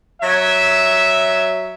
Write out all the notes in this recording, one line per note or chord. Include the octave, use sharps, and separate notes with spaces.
F#3 E5